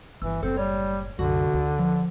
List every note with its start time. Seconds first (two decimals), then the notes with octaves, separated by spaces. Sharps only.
0.22 G1 E3 E6
0.43 F#1 A2 C4 A4
0.57 G3 C#5
1.19 C2 F#2 D3 F#4
1.54 D2
1.79 F3